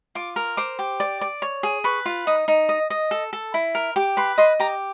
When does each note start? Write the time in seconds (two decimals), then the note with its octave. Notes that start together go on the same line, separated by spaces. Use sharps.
0.15 F4 D6
0.36 A#4
0.57 C5 D6
0.79 G4
1.00 D5
1.21 D5
1.42 C#5
1.63 G#4
1.84 B4 C#6
2.06 F4
2.27 D#4 D#6
2.48 D#4
2.69 D#5
2.90 D#5
3.11 A4
3.33 A4
3.54 E4
3.75 A#4
3.96 G4 D6
4.17 B4 C6
4.38 D#5 C6
4.60 G4 A#5